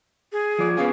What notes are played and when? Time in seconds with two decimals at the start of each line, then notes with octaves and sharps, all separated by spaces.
0.32 G#4
0.59 F3 D5
0.77 B3 C#4 G#4 F5